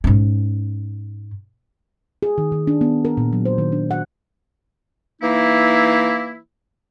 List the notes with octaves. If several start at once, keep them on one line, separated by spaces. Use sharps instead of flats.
G#2 C#4
G#4
D#3
D#3
D4
B3
A#4
A#2
F#3
C5
D#3
D4
F#5
E3 A#3 D#4 E4